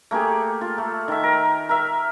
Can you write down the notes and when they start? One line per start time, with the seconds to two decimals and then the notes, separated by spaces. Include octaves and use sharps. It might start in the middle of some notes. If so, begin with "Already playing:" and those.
0.11 A3 A#3 G4 G#4
0.61 F4
0.78 A3
1.08 D#3 E5
1.24 A#4
1.69 A#4 E5